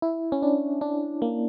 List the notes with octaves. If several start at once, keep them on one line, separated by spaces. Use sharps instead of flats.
E4
C#4
D4
D4
A#3